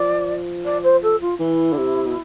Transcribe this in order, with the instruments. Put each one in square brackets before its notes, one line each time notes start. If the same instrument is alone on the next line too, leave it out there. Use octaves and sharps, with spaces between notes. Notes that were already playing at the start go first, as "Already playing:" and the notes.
Already playing: [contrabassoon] F3 [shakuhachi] D5
[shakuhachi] D5
C5
A4
F4
[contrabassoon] E3 [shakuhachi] E4
[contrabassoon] D3
C3
B2